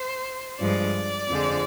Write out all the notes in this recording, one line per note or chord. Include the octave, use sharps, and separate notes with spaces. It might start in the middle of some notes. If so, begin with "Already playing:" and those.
Already playing: C5
G2 F3 G#3 D5
F2 D3 F3 G#3